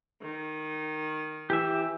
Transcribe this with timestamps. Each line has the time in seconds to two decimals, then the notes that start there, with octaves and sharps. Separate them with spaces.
0.22 D#3
1.50 E3 G4 E5